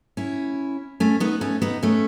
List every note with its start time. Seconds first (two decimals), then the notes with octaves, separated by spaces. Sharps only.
0.17 C#4 E4
1.00 A3 C#4
1.20 B3 D#4
1.41 A3 C#4
1.62 B3 D#4
1.83 A3 C#4